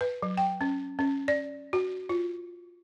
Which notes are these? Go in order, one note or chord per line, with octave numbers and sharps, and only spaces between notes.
B4
F#3
G5
C#4
C#4
D5
F#4
F4